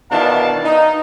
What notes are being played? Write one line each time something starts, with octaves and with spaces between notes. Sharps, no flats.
B2 D#3 E3 D4 F5 A5
D#4